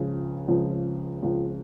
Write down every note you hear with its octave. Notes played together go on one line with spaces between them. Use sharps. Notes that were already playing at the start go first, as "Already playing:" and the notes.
Already playing: C#2 C#3 F3
C#2 C#3 F3
C#2 C#3 F3